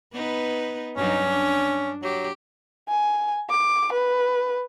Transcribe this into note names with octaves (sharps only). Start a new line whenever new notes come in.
B3 D#4 B4
G2 F#3 C#4 D#4
D4
F#3 G4
G#5
D6
B4